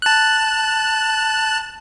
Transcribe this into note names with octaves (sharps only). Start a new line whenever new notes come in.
A5 F#6